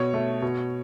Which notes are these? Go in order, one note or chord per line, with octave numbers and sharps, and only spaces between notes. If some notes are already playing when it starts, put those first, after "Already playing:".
Already playing: B2 C#5
A3
B2